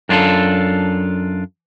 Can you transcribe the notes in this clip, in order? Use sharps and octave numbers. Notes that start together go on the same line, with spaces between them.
F#2 D4 F4 G4 A4